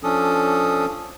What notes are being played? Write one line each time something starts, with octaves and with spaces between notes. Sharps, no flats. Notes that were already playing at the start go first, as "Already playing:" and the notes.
F3 C#4 D4 A4 D#6